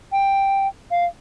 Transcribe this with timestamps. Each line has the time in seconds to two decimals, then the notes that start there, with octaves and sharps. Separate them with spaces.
0.12 G5
0.91 F5